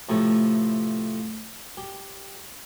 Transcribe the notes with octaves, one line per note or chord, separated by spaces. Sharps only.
A2 C3 F3 A3
G4